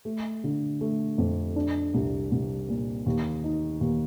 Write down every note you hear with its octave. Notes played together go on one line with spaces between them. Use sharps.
A3
D3
A3
F2
D4
C2
C2
A#2
D#2
D#4
D#2